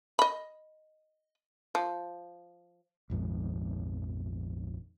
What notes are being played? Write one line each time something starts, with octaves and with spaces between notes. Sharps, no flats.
D#5 B5
F3
A#1 F2 G#2 D#3